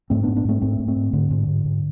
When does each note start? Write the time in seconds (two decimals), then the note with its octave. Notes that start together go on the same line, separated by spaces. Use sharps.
0.10 G#2 A3 C4
0.23 B3 D4
0.28 G#2
0.36 B3 D4
0.45 G#2 A3 C4
0.61 G#2 A3 C4
0.80 G#2
0.88 A3 C4
0.96 G#2
1.13 G#2 D3
1.31 G#2
1.48 G#2
1.65 G#2